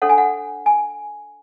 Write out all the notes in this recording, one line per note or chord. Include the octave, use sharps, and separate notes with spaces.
D4 A4 C#5 F#5
G#5
F#5
G#5